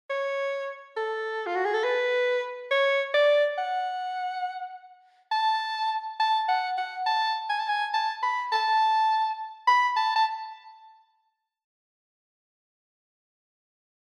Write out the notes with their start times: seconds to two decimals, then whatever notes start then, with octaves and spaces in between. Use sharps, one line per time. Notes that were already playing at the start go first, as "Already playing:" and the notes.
0.10 C#5
0.97 A4
1.46 F4
1.55 F#4
1.65 G#4
1.74 A4
1.84 B4
2.71 C#5
3.14 D5
3.58 F#5
5.31 A5
6.20 A5
6.49 F#5
6.77 F#5
7.06 A5
7.49 G#5
7.59 A5
7.69 G#5
7.94 A5
8.23 B5
8.52 A5
9.67 B5
9.96 A5
10.16 A5